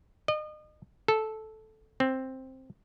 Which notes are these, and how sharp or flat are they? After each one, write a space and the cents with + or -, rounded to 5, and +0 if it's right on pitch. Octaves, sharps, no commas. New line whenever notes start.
D#5 -35
A4 -10
C4 +5